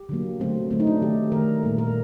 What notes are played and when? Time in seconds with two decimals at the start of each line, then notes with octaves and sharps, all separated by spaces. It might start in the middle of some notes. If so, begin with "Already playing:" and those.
Already playing: G4
0.09 D3 F#3 A#3
0.40 D3 F#3 A3 C4
0.71 D3 F#3 A3 C4
0.80 D#4
0.87 D4
1.01 D#3 A3 G4
1.32 D#3 A3 A#4
1.63 A#2 G3 A#3
1.78 A#4